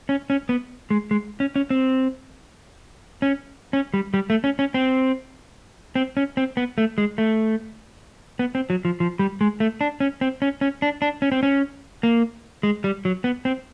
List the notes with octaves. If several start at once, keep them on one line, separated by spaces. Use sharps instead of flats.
C#4
C#4
B3
G#3
G#3
C#4
C#4
C4
C#4
C#4
G3
G3
A3
C#4
C#4
C4
C4
C#4
C4
B3
A3
G#3
A3
B3
C4
F#3
F3
F3
G3
G#3
A3
D4
C#4
C4
C#4
C#4
D4
D4
C#4
C4
C#4
A#3
G#3
G3
F#3
B3
C4